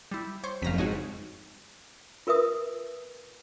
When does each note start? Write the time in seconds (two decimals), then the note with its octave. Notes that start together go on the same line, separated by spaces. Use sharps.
0.11 G3 E4
0.44 C5 C#5 C#6
0.62 F#1 F2 F5 A#5 B6
0.78 G#2 F#4 C#5 D#5
2.27 F4 A#4 B4 E5 D#6